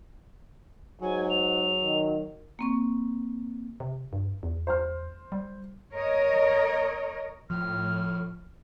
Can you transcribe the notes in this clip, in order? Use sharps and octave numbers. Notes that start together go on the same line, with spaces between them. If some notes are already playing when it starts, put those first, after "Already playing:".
G#2 F#3 G#5
F7
D#3
A#3 C4 C#6
C3
G2
E2
C5 C6 F6
G3
A#4 C#5 D#5
A2 F3 F6